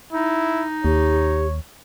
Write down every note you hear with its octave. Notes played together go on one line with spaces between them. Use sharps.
D#4 E4
D#2 G4 C#5